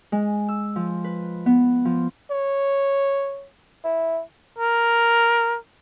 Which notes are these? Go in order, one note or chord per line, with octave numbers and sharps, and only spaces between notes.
G#3
E6
F3
B4
B3
F3
C#5
E4
A#4